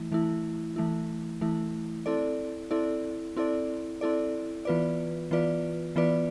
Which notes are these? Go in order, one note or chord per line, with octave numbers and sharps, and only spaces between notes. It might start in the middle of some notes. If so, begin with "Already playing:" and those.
Already playing: E3 A3 E4
E3 A3 E4
E3 A3 E4
E3 A3 E4
C4 E4 A4 D5
C4 E4 A4 D5
C4 E4 A4 D5
C4 E4 A4 D5
E3 B3 F4 B4 D5
E3 B3 F4 B4 D5
E3 B3 F4 B4 D5